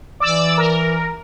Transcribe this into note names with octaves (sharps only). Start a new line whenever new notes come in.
E3 D5 D6 E6
A#4